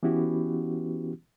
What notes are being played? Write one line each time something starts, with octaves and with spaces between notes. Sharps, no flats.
E3 B3 C#4 E4 F#4 G4